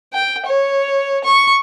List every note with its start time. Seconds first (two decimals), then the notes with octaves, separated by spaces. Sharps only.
0.13 G5
0.45 C#5
1.24 C#6